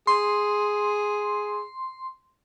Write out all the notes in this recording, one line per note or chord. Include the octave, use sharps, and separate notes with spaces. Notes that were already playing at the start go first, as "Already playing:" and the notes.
G#4 C6